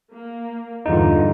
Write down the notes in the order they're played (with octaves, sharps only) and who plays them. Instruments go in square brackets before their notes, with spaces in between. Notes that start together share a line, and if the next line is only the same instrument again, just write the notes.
[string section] A#3
[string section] E2 G2 D3 [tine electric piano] D#4 F4